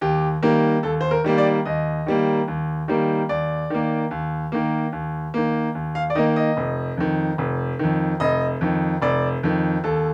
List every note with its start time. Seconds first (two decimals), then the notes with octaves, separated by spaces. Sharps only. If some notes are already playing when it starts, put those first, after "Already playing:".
0.01 D#2 G4
0.43 D#3 G3 A#3
0.83 D#2 A4
1.01 C5
1.11 A#4
1.24 D#3 G3 A#3
1.38 D5
1.65 D#2 D#5
2.06 D#3 G3 A#3
2.48 D#2
2.88 D#3 G3 A#3
3.29 D#2 D5
3.70 D#3 A#3
4.11 D#2
4.52 D#3 A#3
4.93 D#2
5.34 D#3 A#3
5.75 D#2
5.95 F5
6.10 D5
6.15 D#3 A#3 D#5
6.36 D#5
6.57 F1
6.97 F2 D#3
7.38 F1
7.79 F2 D#3
8.20 F1 D#5
8.61 F2 D#3
9.02 F1 D5
9.43 F2 D#3
9.84 D#2 A4